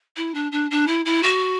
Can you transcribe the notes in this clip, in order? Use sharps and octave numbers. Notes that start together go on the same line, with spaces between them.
E4
D4
D4
D4
E4
E4
F#4